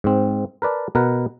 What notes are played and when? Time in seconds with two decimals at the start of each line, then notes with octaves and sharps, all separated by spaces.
0.04 G#2 C4
0.62 A#4 B4 D5 A5
0.95 B2 A#4 B4 F#5